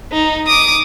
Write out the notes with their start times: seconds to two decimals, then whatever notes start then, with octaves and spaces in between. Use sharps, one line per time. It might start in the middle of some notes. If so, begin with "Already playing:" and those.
0.12 D#4
0.47 D6 D#6